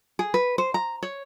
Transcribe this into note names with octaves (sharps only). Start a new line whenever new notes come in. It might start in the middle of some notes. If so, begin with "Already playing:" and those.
G#4
B4
C5
A#5
C#5